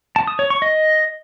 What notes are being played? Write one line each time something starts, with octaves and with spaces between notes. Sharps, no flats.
A5
D#6
C#5
C#6
D#5